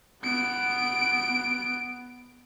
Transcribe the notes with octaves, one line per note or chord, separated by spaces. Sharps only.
B3 D7